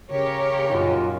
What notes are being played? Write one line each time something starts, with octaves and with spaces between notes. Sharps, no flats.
C#3 G4 A#4 C#5
F#2 A#2 D#4 F4 F#4